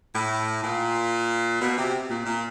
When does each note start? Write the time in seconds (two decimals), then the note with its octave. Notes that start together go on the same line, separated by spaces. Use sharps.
0.14 A2
0.63 A#2
1.61 B2
1.77 C3
2.10 A#2
2.26 A#2